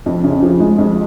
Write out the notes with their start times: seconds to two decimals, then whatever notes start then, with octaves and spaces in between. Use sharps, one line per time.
0.06 F2
0.24 C#3
0.42 F3
0.60 G#3
0.78 F2